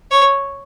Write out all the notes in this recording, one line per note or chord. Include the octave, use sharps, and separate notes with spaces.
C#5